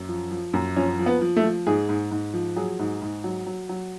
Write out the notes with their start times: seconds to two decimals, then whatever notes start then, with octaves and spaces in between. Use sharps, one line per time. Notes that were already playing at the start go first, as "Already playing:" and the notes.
Already playing: F#2
0.09 F3
0.31 F3
0.53 F#2
0.76 F3 C#4
0.99 F3
1.06 B3
1.21 F3
1.37 A3
1.44 F3
1.67 G#2 G#4
1.89 G#2
2.11 G#2
2.33 F3
2.56 F#3 G#4
2.79 G#2
3.02 G#2
3.24 F#3
3.47 F#3
3.69 F#3